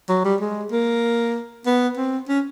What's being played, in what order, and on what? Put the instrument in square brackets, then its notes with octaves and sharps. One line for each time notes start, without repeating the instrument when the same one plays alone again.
[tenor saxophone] F#3
G3
G#3
A#3
B3
C4
C#4